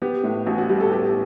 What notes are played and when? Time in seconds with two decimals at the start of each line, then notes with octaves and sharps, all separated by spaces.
0.02 B3 G4
0.24 A2
0.46 A1 F#4
0.58 F#4
0.69 G3 G4
0.80 A4
0.91 B3 G4